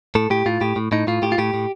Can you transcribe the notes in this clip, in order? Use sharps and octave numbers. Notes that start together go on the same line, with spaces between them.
A2 A4
A2 G4
A2 F4
A2 G4
A2
A2 D#4
A2 F4
A2 G4
F4
A2 G4
A2